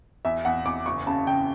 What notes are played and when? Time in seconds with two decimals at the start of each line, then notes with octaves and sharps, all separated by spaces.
0.25 E2 E5
0.45 E2 F#5
0.65 E2 D6
0.86 F#1 C#6
1.06 C#3 A5
1.27 C#3 G5